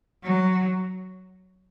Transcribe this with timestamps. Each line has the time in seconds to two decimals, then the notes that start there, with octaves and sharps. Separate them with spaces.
0.23 F#3